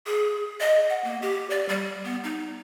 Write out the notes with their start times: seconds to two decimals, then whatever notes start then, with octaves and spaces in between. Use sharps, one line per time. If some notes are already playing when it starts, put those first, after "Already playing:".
0.06 G#4
0.60 D#5
0.89 F#5
1.04 A#3
1.22 G4
1.50 D5
1.69 G3
2.04 B3
2.24 D#4